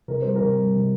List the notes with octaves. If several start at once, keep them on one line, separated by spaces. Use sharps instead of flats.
C3 A#4
G3 C5
A#4
C3
G3
C3